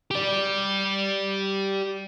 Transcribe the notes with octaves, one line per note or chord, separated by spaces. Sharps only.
G4 D5